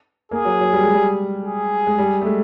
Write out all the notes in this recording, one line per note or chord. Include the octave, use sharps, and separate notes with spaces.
A#3 G#4
F#3
F#3
G3
G#3
G3
G#4
G#3
G3
A3
G#3